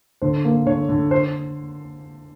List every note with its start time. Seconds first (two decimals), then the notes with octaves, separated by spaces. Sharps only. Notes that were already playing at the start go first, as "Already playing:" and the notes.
0.22 D3 C5
0.45 A#3
0.66 D3 C#5
0.89 D3
1.11 C5